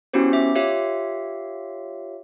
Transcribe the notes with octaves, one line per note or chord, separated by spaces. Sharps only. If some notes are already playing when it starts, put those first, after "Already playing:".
B3 C#4 E4 F#4 G4 C5
E5 D6
F4 G4 C#5 E5 F5